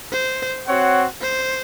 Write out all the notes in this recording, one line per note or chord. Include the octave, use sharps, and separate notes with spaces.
C5
C4 F#4 C#5 F#5
C5